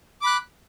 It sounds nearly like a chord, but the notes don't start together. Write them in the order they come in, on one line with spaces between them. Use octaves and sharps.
D6 B5 F#6